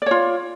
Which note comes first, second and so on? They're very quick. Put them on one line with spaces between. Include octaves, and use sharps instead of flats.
D5 C#5 F4